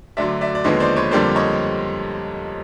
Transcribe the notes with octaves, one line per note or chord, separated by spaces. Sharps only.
D2 D3 F#3 D5 E5
D5 E5
D5
D#2 D3 F3 G#3 B3 C#5 D#5
C5 D5
B4 C#5
F2 D3 G3 A#3 C5 D5
C#5 D#5